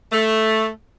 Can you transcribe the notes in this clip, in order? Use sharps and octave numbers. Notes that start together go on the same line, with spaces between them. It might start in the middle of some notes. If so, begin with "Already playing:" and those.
A3